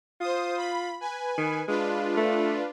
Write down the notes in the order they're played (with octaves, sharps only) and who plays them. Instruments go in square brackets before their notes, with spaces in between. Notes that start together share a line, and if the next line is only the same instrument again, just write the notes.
[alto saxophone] F4 [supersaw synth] C5 D#6
[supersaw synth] B5
B4 G#5
[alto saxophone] D#3
[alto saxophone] G#3 [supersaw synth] D4 F4 B4
[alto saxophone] A3